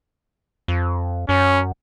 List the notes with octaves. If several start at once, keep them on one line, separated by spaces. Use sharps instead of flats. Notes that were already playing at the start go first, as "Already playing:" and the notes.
F2
F#2 C#4